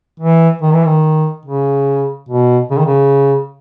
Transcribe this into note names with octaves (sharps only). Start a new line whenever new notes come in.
E3
D#3
E3
D#3
C#3
B2
C#3
D#3
C#3